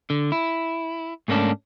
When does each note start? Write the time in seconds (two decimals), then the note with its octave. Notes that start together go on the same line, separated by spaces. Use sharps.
0.10 D3
0.32 E4
1.28 G#2 A3 A#3 C#4 D4